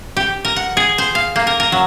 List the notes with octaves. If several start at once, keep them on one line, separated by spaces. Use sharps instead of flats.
G4
A#4
F#5
G#4
C5
F5
A#3
A#4
A#4
F#3